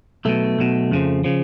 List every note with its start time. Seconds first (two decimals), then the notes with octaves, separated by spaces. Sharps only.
0.25 B1 B2 A3
0.59 B1 B2
0.91 F2 C#3 F3
1.24 C#3 F3